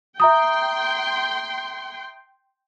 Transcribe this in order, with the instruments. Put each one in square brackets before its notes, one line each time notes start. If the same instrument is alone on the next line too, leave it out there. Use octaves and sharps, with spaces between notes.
[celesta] E5 A#5 D#6 [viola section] G5 C6